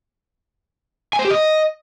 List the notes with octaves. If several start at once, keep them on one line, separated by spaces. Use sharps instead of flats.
G#5
C5
G4
D#5